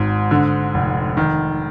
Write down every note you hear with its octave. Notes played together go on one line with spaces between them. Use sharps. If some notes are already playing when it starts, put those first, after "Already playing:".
Already playing: G#1 G#2
D3
F1
D#3